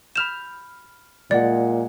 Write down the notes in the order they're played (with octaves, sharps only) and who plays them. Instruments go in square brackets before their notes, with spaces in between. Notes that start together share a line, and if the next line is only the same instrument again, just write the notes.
[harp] B5 F6 G6 [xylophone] E7 F7
[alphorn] A#2 [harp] G#3 F#5 [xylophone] D5